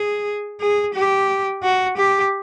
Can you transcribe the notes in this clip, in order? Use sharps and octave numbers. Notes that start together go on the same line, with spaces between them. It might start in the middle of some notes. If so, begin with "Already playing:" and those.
Already playing: G#4
G#4
G4
F#4
G4